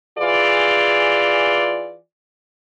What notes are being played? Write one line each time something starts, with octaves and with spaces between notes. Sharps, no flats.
E3 F4 G#4 D5